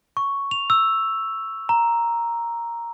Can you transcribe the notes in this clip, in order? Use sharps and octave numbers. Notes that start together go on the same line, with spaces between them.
C#6
F7
E6
A#5